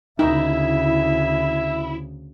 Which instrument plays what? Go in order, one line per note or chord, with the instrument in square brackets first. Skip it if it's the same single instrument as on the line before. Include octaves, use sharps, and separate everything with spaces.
[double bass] D2 C#3 [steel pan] D#4 [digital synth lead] E4 [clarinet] E5